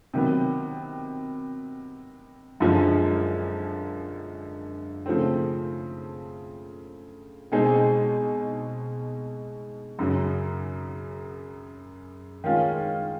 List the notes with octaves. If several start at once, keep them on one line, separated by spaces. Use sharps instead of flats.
C3 D#3 F#3 B3
F#2 D3 F3 G#3
C#3 F3 A3 C4
B2 G#3 C4 D#4 G#4
F#2 C#3 F#3
D#3 G#3 C#4 F4